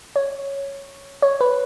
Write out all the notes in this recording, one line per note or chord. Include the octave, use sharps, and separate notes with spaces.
C#5
C#5
B4